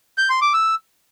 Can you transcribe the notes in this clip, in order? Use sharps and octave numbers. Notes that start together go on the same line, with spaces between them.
G6
C6
D6
E6